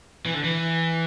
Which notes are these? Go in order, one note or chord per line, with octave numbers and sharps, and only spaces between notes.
E3
D3
E3